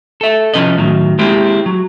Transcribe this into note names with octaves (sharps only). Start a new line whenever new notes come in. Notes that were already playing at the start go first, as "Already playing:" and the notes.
A4 E5
C2 F3 C#4 B4 D#5
A2 D#3 F#3
G#3 A#3 C4 E4 G4
F#3